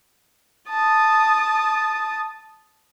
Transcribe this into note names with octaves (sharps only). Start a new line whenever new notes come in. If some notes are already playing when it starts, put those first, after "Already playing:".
A5 D#6